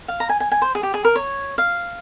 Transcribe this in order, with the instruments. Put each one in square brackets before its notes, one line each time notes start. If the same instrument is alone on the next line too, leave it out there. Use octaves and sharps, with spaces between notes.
[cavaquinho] F5
A#5
G#5
G#5
G#5
C5
G#4
G4
G#4
A#4
C#5
F5